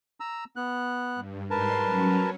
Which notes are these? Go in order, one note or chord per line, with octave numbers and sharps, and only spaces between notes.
A#5 E6
B3 F#6
G2
G#2 G3 A#4 B4 A5 C6
F#3 C#4